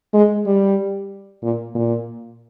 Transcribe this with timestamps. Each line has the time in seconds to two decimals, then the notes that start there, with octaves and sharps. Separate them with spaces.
0.13 G#3
0.46 G3
1.43 A#2
1.75 A#2